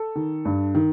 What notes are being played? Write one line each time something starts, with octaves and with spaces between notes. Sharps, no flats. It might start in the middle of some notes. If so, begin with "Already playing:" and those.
Already playing: A4
D#3
G2
D#3